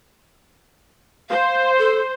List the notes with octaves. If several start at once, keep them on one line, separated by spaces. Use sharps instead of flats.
C5 F5
A4